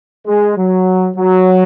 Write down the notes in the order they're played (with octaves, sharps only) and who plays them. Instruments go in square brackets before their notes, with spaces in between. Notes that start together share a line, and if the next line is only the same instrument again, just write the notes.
[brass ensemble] G#3
F#3
F#3